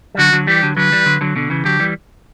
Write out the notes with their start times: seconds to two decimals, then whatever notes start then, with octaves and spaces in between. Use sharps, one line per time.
0.15 G3
0.18 D3 F#3 F#4
0.33 D3 F#3
0.47 E3 G3 G4
0.63 D3 F#3
0.77 D3 F#3 B4
0.92 E3 G3
1.06 D3 F#3
1.21 D3 F#3
1.36 B2 D3
1.50 C#3 E3
1.65 D3 F#3 G4
1.80 E3 G3